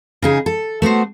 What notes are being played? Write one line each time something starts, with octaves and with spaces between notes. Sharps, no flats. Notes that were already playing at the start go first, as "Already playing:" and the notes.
C#3 D#4 G#4
A4
A3 B3 F#4 C5